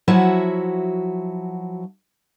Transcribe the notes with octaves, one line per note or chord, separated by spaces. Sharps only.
F3 F#3 E4 F#4 E5